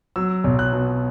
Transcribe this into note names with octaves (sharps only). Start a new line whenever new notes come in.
F#3 E6
B1
F#6
B2